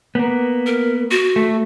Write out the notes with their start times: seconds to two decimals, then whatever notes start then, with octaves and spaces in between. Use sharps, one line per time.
0.15 A#3 B3
0.66 A#4
1.11 F#4
1.36 A3